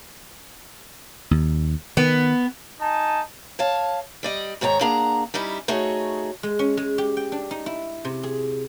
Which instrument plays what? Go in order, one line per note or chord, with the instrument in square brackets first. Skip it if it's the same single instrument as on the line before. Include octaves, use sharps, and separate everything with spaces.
[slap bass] D#2
[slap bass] D#3 [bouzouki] B3
[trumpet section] D#4 G#5 A5
[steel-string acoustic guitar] C#5 F5 A5
G3 D5 D#5
G#2 D#3 C#5 G#5 A#5
A#3 D4 G#4 F#5 A#5
G3 C#4 D#4 E4
A3 D#4 F#4 G#4 C#5
[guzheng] G#3
C#4
G#3
G4
G5
D4
D#4
E4
C3
G#4